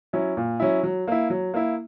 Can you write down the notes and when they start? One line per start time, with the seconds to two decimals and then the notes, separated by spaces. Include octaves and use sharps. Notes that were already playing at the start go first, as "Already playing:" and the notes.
0.13 F#3 C#4 E4
0.37 A#2
0.60 F#3 C#4 E4
0.83 F#3
1.07 A#3 E4
1.30 F#3
1.54 A#3 E4